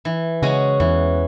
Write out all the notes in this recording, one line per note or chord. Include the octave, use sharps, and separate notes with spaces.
E3
C#3 G#3 C#4 F#4
E2 E3